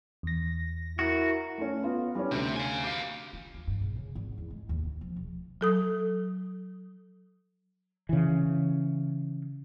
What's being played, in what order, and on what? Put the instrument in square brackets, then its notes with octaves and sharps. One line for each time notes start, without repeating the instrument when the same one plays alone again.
[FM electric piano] E2 A#6
[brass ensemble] E4 A#4 [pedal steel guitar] F#4
[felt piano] A3 C#4
B3 F4
G3 C#4
[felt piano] D2 [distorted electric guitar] C3 C4
[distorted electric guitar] F5 G#5
G4 F5
[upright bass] F4
D#2
G2
A#1
C#3
G#1
E2
G#3
D#2
D2
F3
E1
[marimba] F#3 A4 D#6
[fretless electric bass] C#3 E3